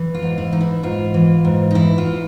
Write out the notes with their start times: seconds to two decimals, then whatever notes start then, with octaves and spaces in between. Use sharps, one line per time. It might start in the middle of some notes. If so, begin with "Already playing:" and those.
Already playing: E3
0.15 F4
0.22 G#2
0.38 E4
0.53 E3 D#4
0.61 E4
0.83 G#2 F4
1.14 E3
1.45 G#2
1.71 D#4
1.75 E3 E4
1.98 F4